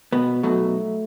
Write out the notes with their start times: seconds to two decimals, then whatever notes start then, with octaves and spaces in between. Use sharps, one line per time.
0.12 B2 B3
0.43 B1 B2 F#3 A3